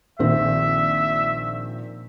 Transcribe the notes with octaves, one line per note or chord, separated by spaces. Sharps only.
A#1 D#3 C4 E5